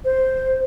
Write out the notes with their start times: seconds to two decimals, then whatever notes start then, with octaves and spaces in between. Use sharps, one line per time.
0.05 C5